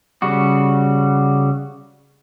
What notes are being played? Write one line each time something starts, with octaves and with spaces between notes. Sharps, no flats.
C#3 G3 F#4